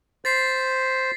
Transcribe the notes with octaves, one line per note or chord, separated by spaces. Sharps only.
C5 A6 B6 C7